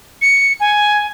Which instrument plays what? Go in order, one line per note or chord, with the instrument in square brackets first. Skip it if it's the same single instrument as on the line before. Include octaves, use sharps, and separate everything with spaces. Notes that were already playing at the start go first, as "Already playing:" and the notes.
[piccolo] C#7
G#5